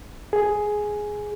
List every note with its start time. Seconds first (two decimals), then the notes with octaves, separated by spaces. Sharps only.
0.33 G#4